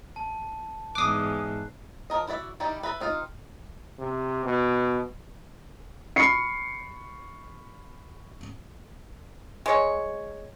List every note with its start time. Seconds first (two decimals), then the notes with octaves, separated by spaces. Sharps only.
0.16 A5
0.95 E2 G#2 D6 D#6 F#6 C7
2.10 F3 C#4 A#4 D#5
2.27 E4 F#4 D5 E5
2.60 G3 D#4 E4 G4 D5
2.83 B4 E5 A#5 B5
3.00 C4 D#4 F4 F5
3.99 C3
4.45 B2
6.16 B5 C#6 C7 C#7
9.66 G#3 C#5